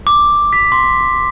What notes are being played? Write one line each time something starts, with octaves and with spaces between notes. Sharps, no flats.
D6
B6
C6